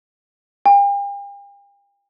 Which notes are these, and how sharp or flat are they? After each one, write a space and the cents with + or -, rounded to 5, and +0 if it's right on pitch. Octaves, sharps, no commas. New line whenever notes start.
G5 +45